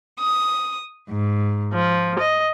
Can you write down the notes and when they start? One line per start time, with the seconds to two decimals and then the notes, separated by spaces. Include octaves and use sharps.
0.20 D#6
1.09 G#2
1.73 F3
2.18 D#5